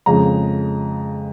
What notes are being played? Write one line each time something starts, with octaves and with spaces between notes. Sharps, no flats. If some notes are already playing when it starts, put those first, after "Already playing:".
F2 C#3 G#3 A#5